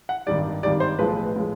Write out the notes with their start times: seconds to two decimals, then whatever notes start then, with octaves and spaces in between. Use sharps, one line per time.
0.09 F#5
0.27 G#1 G2 D#3 G3 D5
0.63 G#1 G2 D#3 G3 D5
0.80 C5
0.99 B1 A2 F3 G#3 B4
1.36 A2 F3 G#3